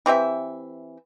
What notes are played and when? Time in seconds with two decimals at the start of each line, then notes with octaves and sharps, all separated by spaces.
0.06 E3 C4 G4 E5